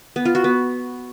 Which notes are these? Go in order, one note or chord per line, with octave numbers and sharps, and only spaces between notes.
B3
F4
F#4
B3